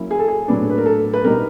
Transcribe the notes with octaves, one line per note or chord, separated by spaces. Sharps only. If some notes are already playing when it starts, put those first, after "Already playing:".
Already playing: F#3 A#3 C#4 E4
G#4
A4
G#4
A2 F#3 B3 D4
B4
A#4
A4
B4
B2 G3 B3 D#4 A#4